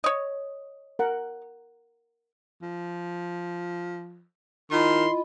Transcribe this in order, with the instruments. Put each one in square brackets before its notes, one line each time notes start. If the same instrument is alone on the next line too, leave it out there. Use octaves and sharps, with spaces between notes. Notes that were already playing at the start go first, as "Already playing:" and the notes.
[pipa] C#5 D#5
[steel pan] A#4 F#5
[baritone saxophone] F3
[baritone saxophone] D#3 [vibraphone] E4 D#5 B5 [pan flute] F4 [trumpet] C6